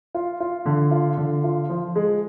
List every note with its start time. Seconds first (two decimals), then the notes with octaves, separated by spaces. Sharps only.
0.15 F4
0.40 F4
0.66 D3
0.91 F4
1.17 D3
1.44 F4
1.70 F3
1.96 G#3